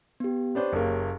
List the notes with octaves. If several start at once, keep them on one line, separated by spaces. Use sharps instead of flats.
B3 G4
B3 D4 G4 C5 C#5
F#1 A#3